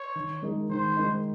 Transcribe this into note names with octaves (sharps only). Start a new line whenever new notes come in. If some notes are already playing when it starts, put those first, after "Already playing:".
Already playing: C#5
D#3
G#3 D#4 A#4 D#5
D#3 C5
G#3 D#4 A#4 D#5